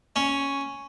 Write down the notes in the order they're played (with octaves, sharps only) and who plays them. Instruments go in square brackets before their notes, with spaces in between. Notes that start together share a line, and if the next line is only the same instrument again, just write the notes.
[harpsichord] C#4